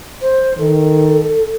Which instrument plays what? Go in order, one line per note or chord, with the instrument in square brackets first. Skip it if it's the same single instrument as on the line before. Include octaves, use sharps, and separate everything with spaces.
[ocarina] C5
[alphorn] D#3 [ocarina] A4